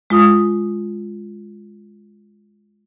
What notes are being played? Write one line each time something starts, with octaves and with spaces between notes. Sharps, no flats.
G#3 F4 D#6